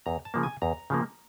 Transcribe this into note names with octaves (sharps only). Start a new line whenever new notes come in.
E2 A#5
A5
C#3 F3 A#3
G#5
E2 A#5
C#3 F3 A#3